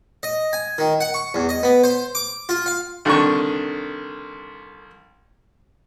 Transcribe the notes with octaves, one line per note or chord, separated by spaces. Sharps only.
D#5
G#5
D#3
F#5
C#6
E2
D#5
B3
C5
D6
F4
F5
C2 D3 D#3 D4 C#6